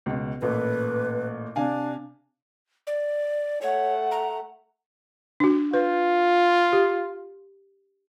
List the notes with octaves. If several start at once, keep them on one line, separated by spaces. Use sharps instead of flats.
C#2 B2
A1 A#2 A3 B4
C3 D4 F5 G#5
D5
A3 C#5 F#5
A#5
D4 F#4
F4 B4
G4